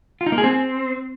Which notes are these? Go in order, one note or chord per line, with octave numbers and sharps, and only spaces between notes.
F4
D#4
A#3
G#4
C4